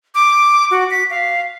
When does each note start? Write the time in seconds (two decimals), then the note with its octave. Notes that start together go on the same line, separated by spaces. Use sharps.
0.15 D6
0.71 F#4
0.91 B6
1.10 F5